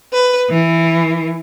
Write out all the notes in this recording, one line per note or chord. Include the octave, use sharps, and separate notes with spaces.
B4
E3